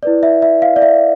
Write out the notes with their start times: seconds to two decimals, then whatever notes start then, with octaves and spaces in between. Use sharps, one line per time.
0.03 E4 B4 D5
0.23 E5
0.42 E5
0.62 F5
0.76 D5
0.82 E5